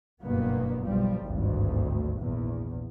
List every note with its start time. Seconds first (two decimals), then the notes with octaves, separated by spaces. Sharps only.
0.22 F#1 G2 B2 A#3 B3
0.84 B1 F3 G3
1.22 G#1 D2 G2
2.20 A#1 E2